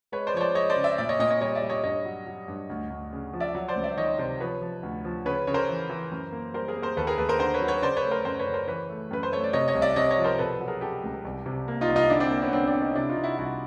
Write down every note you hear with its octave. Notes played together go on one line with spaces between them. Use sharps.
G#3 B4 C#5
C5 D5
F3 C#5
C5 D5
G#3 C#5 D#5
C5 D5
C#3
D5 E5
A#2 D5 E5
C#5 D#5
A#2 C#5 D#5
C#5 D#5
G3 C#5 D#5
D5 E5
G3
C#5 D#5
G2 C#5 D#5
F#3
F#3
G2
D2
D2
C#3
F3
D5 E5
F#3
C5 D5
C#2
D5 E5
D#3 C#5 D#5
C3 C5 D5
F3 B4 C#5
F3
D2
F3
C#3 B4 C#5
C#3 C#5
A#4 C5
E3
E3
F#2
A#3
G3 A#4 C5
G#4 A#4
A#3
A#4 C5
D#2 A4 B4
G#4 A#4
D#2 A4 B4
A#4 C5
D3 A#4 C5
B4 C#5
F#3
B4 C#5
C#3 C5 D5
B4 C#5
A3
A#4 C5
F#2 A#4 C5
B4 C#5
C#3
A#4 C5
E3 B4 C#5
A3
F#2 B4
C5
A3 C#5
D5
C3 C#5 D#5
C#5 D#5
C2
D5 E5
C3 C#5 D#5
C#5 D#5
F3
A#4 C5
B2 A4 B4
F#3
G#4 A#4
F#3 G4 A4
C#2
C2
C3
A#3
D#4 F4
C2
D#4 F4
D3 D4 E4
C4 D4
A#3
B3 C#4
D3 C4 D4
C4 D4
D3
C#4 D#4
C3 D4 E4
D#4 F4
C3
E4 F#4
C2 E4 F#4